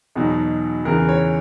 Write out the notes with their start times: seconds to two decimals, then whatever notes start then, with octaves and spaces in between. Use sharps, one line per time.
0.15 E2 B2 F#3 D#4
0.85 E2 C#3 E3 A#4
1.09 C#5